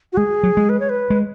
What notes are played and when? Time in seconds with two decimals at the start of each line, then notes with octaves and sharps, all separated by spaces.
0.13 F#4
0.17 G#3 G#4
0.43 F#3
0.57 G#3
0.69 B4
0.80 C#5
0.89 B4
1.10 G#3